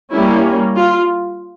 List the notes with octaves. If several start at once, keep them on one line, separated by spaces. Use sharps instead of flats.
G3 A#3 C#4 E4
F4